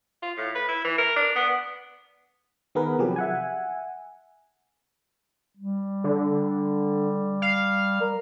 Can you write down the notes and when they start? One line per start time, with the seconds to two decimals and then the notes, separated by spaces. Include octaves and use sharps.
0.23 F4
0.38 A2
0.55 B4
0.69 E4
0.85 E3
0.98 A#4
1.16 D4
1.36 B3
2.75 D#3 B3 G#4 A#4 B4
2.98 C3 F3 F#3 G4 G#4 B4
3.16 E5 F#5 G#5
5.57 G3
6.04 D3
7.42 F5
8.00 A#4